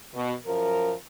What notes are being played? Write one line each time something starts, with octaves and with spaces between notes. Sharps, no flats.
B2
F#2 F3 A#4